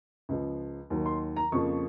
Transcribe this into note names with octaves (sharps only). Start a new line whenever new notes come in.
C#2 C#3 F3
D#2 D#3 F#3
C6
A#5
F2 C#3 F3 A#3 C#6